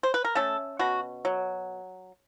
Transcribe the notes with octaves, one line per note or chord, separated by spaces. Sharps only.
C5
B4
A#4
A3 C#4 A4
B2 F#4
F#3